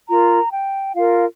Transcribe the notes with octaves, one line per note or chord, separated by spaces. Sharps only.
F4 A#4 A#5
G5
F4 A#4 F5